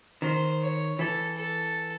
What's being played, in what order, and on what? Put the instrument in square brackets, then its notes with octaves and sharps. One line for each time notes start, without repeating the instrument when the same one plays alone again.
[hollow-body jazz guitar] D#3 [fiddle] C5
[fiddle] C#5
[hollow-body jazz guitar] E3 [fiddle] A4
[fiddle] A4